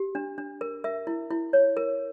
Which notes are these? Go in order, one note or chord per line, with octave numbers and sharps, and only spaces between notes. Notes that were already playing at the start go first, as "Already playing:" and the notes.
Already playing: G4
D4
D4
A#4
A#4 E5
E4
E4
C#5
A#4